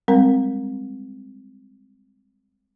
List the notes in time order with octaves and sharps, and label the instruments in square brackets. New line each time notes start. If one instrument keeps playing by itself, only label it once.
[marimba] G3 G#3 C4 A#4